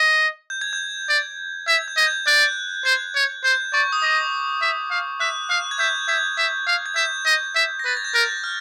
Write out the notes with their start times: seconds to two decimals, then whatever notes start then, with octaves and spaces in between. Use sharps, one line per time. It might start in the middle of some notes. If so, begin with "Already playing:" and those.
Already playing: D#5
0.50 G6
0.61 G#6
0.73 G6
1.09 D5
1.67 E5 G#6
1.88 G6
1.97 D#5 G#6
2.07 G6
2.27 D5 F#6
2.85 C5 G#6
3.15 C#5
3.44 C5 G6
3.73 D5 C#6
3.92 D#6
4.02 D#5 D6
4.62 E5
4.90 F5
5.20 E5 F#6
5.50 F5 F#6
5.71 G#6
5.79 E5 G6
6.08 E5 G#6
6.38 E5
6.67 F5
6.86 G#6
6.96 E5 G6
7.26 D#5
7.55 E5
7.79 A#6
7.85 B4 A6
7.97 G#6
8.04 G6
8.14 A#4 F#6
8.44 F6